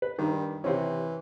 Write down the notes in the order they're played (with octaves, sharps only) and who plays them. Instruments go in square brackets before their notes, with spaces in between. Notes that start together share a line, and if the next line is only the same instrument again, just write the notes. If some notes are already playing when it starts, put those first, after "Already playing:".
[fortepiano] B4
[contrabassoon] G2 [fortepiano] D#3
[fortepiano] C3 C4 C#4 [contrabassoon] E3